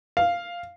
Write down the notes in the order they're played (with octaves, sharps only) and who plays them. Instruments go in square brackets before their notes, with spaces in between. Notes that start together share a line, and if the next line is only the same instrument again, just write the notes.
[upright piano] F5